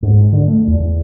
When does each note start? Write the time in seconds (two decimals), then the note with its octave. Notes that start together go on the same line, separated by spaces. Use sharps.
0.02 G#2
0.33 D3
0.47 A3
0.67 E2